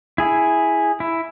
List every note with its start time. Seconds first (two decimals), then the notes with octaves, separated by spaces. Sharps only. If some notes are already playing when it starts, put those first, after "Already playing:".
0.18 E4 G#4
1.00 E4